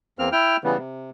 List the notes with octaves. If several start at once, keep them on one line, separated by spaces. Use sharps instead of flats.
E2 A#3 C4 F6
E4 G5 F6
C#3 E3 G3 B3
C3